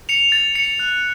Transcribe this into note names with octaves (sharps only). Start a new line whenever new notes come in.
C#7 F7
A6
C#7 F7
F#6